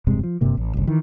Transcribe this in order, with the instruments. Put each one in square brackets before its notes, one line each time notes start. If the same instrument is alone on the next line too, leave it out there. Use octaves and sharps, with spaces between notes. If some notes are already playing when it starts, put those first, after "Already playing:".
[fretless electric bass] E1 G2 C3 G#3
F3
F#1 G2 C3 A#3
A1
F#1 C2
D#3 E3